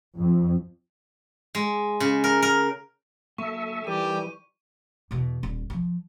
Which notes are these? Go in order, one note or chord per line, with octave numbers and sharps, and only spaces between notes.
F2
G#3
C#3
A#4
A#4
D3 F#3 A#3 A4 E5 C#6
E3 G3 D#4 G4 A4 A#4 D#7
E2 B2
D#1
D#3 F3